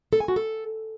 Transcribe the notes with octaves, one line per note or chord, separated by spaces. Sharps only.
A4
G#5
F#4
A4